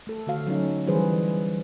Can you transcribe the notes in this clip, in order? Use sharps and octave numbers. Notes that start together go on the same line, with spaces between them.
A3 A4
D3 A3 F#4 F5
F#3 C#4 D#4
E3 G3 G#4 B4 C5